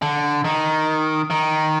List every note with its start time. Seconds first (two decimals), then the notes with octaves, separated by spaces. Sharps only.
0.02 D3
0.45 D#3
1.30 D#3